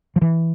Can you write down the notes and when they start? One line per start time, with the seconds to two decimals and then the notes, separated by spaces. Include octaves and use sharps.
0.16 F3
0.22 E3